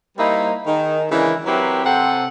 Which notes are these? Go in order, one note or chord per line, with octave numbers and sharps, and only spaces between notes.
G3 A#3 D#4 E4 A#4 C5
D#3 D#4 G#4
C#3 E3 G#3 D4 G#4 A#4
F#3 C4 E4 G4 A#4 B4
C3 C4 A4 F#5 G5